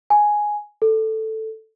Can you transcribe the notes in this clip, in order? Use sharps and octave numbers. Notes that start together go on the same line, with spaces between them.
G#5
A4